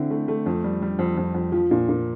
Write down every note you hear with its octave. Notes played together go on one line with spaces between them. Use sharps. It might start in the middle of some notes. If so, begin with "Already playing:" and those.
Already playing: D3 C4 E4
A3
A3
F2
G3
G3
F2
F2
F2
F3
A#2
A#2